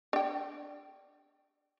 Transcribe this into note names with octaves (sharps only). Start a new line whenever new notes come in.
D4 G5